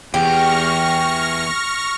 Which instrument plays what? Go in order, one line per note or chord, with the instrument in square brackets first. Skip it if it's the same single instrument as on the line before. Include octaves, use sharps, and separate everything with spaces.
[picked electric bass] E2 [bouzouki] G4 [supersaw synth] C#6 F6 A#6